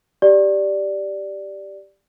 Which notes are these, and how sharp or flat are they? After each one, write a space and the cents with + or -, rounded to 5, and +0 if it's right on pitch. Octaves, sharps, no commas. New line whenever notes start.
G4 +0 D5 +0